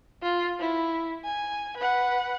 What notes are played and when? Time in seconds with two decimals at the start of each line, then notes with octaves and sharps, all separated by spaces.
0.23 F4
0.59 E4
1.25 G#5
1.77 B4 F#5